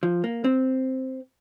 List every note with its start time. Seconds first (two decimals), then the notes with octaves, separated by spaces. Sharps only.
0.03 F3
0.24 A#3
0.44 C4